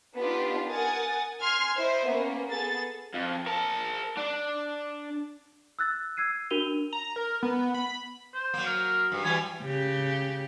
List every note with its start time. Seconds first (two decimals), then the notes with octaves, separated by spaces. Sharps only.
0.18 B3 D4 D#4 F4 G4
0.69 A#4 F#5 G#5 D#6 A6
1.42 G#5 C6 F6 G#6
1.77 E4 C5 D#5 E5
2.07 A#3 B3 C#4
2.50 B3 G#4 A4 A6
3.14 F2
3.47 A#4 A5
4.17 D4
5.79 E6 F#6 A6
6.17 E6 G#6 C7 D#7
6.50 D4 F#4 A#4 D#7 F7 G7
6.92 A#5
7.16 A#4
7.43 B3
7.74 B5
8.34 C5
8.54 F#3 A#3
8.66 A#4
9.12 G2
9.25 E3 F#3 G3 G#5
9.62 C#3 G4